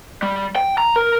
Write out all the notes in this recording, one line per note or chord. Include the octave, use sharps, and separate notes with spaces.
G3
G5
A#5
A#4